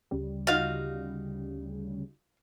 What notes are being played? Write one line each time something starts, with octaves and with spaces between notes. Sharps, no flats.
D2 C#3 G3
D#4 F4 F#4 F5